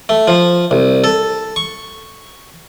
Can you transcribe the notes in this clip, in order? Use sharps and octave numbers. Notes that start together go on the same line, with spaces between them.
A3
F3
C2
A4
C#6